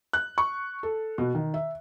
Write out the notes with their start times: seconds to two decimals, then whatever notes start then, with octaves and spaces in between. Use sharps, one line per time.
0.13 F#6
0.38 C#6
0.83 A4
1.18 B2
1.35 D#3
1.54 E5